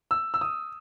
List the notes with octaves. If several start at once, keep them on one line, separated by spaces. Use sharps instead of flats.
E6
E6
D#6